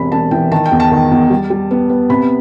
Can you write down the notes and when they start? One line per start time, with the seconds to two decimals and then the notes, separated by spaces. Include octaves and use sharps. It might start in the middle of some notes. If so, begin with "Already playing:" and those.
Already playing: E1 C3 B5
0.12 E1 A5
0.31 E3 G5
0.52 D#3 A5
0.66 G5
0.72 E2
0.80 A5
0.91 D#3
1.11 E2
1.30 G3
1.50 G3
1.71 B3
1.89 B3
2.10 C3 B5